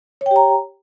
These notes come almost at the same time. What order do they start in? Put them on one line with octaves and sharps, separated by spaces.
C#5 G5 G4 A#5